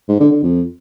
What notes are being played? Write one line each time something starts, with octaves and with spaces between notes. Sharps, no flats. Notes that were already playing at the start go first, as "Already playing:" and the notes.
G#2
D3
D3
F2